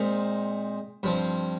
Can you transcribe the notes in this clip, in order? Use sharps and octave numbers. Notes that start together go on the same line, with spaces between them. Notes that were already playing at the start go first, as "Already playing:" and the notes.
Already playing: A#2 G#3 C4 D#4
G2 F3 C4